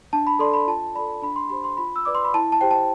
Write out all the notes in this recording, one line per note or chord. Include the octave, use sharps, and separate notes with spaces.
D4 A5
B5
A4 D5 C6
B5
F4 A5
A4 D5 B5
D4 B5
C6
G4 C5 B5
C6
F4 B5
E6
B4 D5 D6
C6
B5
E4 A5
A5
G4 C5 G5
A5